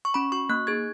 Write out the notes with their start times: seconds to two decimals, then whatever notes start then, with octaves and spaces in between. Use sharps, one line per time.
0.05 C#6
0.14 C#4 B5
0.32 F#4 C#6
0.49 A#3 F#6
0.67 D#4 G#4 G#6